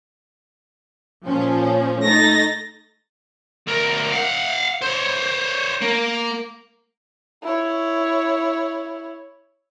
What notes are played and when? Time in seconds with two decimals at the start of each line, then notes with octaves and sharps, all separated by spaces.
1.26 A#2 F3 C#4
2.02 A3 D#4 A6 A#6
3.67 D2 A#4
4.12 F5 F#5
4.82 C5 C#5
5.82 A#3
7.43 E4 C#5